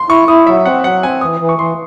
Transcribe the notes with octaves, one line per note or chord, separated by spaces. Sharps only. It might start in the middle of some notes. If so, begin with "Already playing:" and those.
Already playing: C6
E4 C#6
E4 D#6
F#3 E5
C4 F#5
F#3 F#5
C4 G#5
E3 D#6
E3
C#6
E3 C6